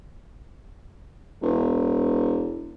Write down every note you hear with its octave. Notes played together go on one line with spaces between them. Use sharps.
E1